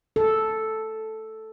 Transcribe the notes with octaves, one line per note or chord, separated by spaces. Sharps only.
A4